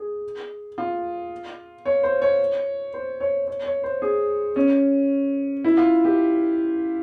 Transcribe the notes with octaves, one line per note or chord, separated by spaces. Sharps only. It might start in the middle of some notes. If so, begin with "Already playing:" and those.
Already playing: G#4
F4
C#5
C5
C#5
C5
C#5
C#5
C#5
C5
G#4
C#4
E4
F4
G4